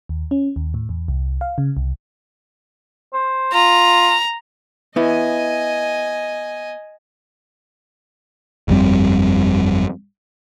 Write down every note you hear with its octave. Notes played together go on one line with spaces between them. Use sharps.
D#2
C#4
D#2
A2
E2
C2
F5
C#3
C2
C5
F4 A#5
B3 E4 D#5 G#5
G1 F2 G3 C4